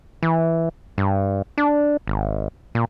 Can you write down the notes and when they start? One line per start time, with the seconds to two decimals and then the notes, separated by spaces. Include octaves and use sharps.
0.23 E3
0.98 G2
1.58 D4
2.07 G#1
2.75 A#2